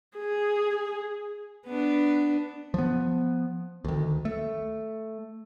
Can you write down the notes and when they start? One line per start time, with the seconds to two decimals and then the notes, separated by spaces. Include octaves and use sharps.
0.18 G#4
1.66 B3 D4
2.74 F3 B3
3.85 D2 D#3
4.25 A3